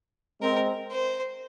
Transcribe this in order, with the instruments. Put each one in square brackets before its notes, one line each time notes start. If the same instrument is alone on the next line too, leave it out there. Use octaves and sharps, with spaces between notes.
[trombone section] G#3 C4 [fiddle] A#4
[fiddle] C5